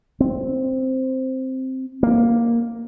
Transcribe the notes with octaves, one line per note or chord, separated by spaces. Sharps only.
C4
A#3